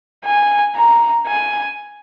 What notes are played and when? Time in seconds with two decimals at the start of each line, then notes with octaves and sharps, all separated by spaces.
0.25 G#5
0.76 A#5
1.27 G#5